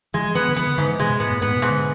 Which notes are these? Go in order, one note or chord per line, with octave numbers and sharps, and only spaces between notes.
E3 G#3
F3
E3 B3
D3
E3 B3
D3
G#2 D3
E3
C3 G#3
B2
A2 B3
A2
G#2 B3
B2
G#2
D3